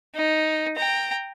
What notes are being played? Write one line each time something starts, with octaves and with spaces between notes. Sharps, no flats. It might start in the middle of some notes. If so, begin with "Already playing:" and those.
D#4
G5 A#5